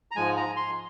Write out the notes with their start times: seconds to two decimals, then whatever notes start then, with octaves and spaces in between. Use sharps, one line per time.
0.11 A#5
0.16 G#2 F3 G#3 G#5
0.37 A#5
0.56 C6